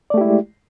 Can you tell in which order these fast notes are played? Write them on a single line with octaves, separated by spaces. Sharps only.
D5 A3 G4 E4 G#3